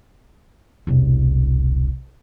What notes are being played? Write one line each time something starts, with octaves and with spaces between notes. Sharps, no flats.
E1 C2